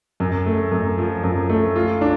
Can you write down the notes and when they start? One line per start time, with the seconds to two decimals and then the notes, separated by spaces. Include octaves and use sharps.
0.20 F#2
0.46 A3
0.71 F#2
0.98 F3
1.23 F#2
1.49 A3
1.76 F4
2.01 D4